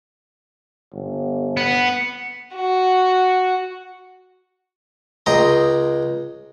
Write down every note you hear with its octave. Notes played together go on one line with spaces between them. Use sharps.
G1
B3
F#4
C#2 D#5 G5 A#5 C6